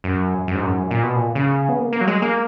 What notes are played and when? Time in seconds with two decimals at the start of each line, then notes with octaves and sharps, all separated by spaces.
0.04 F#2
0.48 F#2
0.55 G#2
0.63 F#2
0.91 A#2
1.03 B2
1.16 A#2
1.35 C#3
1.69 B3
1.79 A#3
1.93 A#3
2.01 F#3
2.08 G#3
2.22 A#3